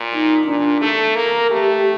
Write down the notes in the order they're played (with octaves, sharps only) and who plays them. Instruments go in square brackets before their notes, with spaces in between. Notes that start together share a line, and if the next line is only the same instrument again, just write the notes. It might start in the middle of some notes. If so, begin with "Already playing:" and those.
Already playing: [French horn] A#2
[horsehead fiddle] D#4
[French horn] A#2 [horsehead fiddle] D4
[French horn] A3 [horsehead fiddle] A4
[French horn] A#3 [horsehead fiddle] A#4
[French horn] A3 [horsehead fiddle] G4